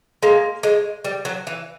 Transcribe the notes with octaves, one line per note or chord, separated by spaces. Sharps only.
G#3 A#3
G#3
G3
F#3
E3